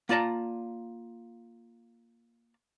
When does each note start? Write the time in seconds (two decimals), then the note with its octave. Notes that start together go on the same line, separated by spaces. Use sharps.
0.09 A#3 F4 D5 A5 A#5